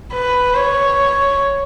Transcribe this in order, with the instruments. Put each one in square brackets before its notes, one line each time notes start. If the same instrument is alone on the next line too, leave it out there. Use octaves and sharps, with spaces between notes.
[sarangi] B4
C#5